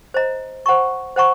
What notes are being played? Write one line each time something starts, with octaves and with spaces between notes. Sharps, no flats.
C5 D#5 A#5
C5 F#5 A#5 C#6
C5 F#5 A#5 C#6